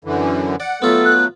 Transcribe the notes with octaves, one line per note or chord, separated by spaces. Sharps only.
F#2 D3 E3
D5 F#5
F#3 A3 B3 F4 A4
F#6